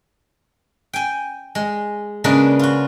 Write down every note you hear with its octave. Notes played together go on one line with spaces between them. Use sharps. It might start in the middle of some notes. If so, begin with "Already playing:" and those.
G5 G#5
G#3
C#3 G#3 A#3 D4 G#4 B4
F4 F#4